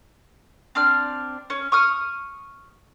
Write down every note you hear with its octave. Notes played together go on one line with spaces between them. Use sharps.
C4 D4 F6
C#4
C#6 D#6 F6